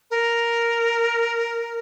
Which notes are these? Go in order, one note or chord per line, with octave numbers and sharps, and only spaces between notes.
A#4